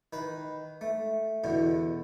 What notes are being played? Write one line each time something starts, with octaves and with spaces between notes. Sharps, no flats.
D#3 B4
A3
E2 B2 D3